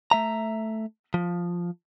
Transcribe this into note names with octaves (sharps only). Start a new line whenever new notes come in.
A3 E5 A#5
F3